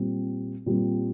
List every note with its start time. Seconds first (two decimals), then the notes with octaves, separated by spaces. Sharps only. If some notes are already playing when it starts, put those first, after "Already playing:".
Already playing: A#2 G3 C4
0.66 A#2 G3 C4